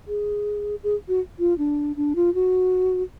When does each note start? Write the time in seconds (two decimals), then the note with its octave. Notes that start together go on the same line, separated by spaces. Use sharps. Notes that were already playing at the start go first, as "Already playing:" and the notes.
0.07 G#4
0.83 G#4
1.08 F#4
1.39 F4
1.58 D4
1.96 D4
2.16 F4
2.34 F#4